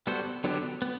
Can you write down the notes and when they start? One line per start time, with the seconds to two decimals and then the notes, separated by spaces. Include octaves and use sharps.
0.07 G3 B3 F#4 A4 C5
0.44 D3 F#3 B3 D4 G4
0.82 B3